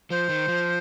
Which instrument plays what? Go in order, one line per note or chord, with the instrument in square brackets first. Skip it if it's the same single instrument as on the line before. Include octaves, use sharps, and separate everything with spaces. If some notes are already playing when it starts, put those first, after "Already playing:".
[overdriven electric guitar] F3 [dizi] C5
[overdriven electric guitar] D#3
F3